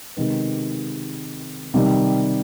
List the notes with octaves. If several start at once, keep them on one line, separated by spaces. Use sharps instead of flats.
C3 D#3 G#3 B3
C3 D#3 G3